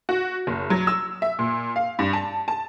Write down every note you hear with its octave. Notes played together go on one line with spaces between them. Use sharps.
F#4
F#1
F#3
E6
E5
A#2
F5
G2
A5
A5